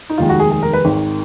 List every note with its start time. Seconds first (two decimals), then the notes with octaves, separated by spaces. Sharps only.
0.10 D#4
0.18 F1 D#2 D#3 G#3 F4
0.29 F#4
0.40 G#4
0.51 G#4
0.63 A#4
0.73 B4
0.85 G#1 G#2 D#3